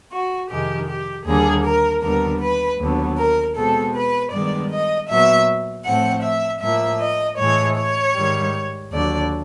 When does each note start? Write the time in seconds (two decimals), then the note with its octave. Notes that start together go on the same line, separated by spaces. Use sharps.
0.11 F#4
0.49 F2 C3 D#3 G#3 G4
0.87 G4
1.26 D#2 D3 G3 A#3 G#4
1.64 A#4
2.02 D#2 D3 G3 B3 A#4
2.40 B4
2.79 D#2 D3 F#3 B3
3.17 A#4
3.55 B2 G#3 C4 A4
3.94 B4
4.31 G2 D#3 G#3 B3 D5
4.70 D#5
5.09 A#2 F#3 B3 E5
5.84 A2 F3 A3 C4 F#5
6.23 E5
6.61 A2 F3 A#3 E5
7.00 D#5
7.37 A2 E3 G#3 C#5
7.77 C#5
8.14 G#2 D#3 G3
8.91 D#2 D3 F#3 D5